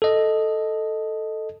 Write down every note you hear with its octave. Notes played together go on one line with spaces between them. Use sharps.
A4 D#5